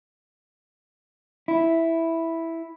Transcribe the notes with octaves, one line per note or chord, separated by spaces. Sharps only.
E4